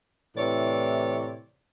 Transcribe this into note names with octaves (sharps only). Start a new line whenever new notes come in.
A2 C3 E3 C#5 D5